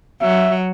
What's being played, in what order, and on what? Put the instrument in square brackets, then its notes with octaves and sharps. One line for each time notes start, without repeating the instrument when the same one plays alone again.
[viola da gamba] F#3 [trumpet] E5